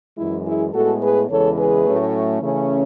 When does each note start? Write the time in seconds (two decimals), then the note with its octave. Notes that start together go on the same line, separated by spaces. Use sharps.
0.17 F#2 E3 G#3 E4
0.44 E4 G#4
0.73 A2 G#3 B3 F#4 A4
1.01 G#4 B4
1.29 E2 C#3 E3 G#3 A4 C#5
1.57 G#4 B4
1.86 A2 F#3 A3 C#4
2.42 C#3 E3 A3 C#4